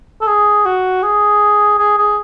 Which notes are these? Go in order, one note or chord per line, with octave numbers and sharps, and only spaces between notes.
A4
G#4
F#4
G#4
G#4
G#4